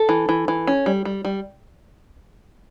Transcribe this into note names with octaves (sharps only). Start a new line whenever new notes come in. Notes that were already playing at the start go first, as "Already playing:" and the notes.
Already playing: A4
E3
E3
E3
C#4
G3
G3
G3